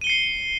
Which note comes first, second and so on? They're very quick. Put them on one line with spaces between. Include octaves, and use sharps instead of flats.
D#7 G7 C#7 C7